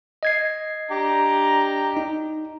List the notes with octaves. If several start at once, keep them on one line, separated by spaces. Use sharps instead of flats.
D#5 G#6 C7
D4 G4 A#5
D#4